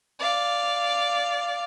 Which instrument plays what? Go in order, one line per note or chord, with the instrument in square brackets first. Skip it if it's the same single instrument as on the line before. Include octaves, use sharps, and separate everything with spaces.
[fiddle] D5 F5